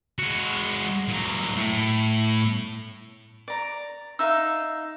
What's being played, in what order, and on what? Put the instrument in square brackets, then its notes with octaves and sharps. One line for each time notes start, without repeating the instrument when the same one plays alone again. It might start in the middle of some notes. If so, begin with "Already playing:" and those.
[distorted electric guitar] G#3 F#4
A#2 F#3
A2
[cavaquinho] D5 A#5
[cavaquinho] D#4 E5 F5 [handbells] E6